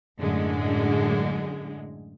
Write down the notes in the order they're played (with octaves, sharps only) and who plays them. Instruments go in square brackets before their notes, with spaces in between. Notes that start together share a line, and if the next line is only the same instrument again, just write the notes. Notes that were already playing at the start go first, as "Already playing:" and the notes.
[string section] F#2 A2 D3 G#3